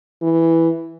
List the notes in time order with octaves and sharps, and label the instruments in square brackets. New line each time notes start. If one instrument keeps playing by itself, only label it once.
[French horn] E3